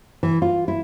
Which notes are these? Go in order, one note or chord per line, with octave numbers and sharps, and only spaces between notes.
E3
F4
E4